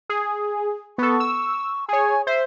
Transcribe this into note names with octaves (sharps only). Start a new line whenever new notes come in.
G#4
B3 A4 C#6
E6
G#4 C#5 G#5
C5 E5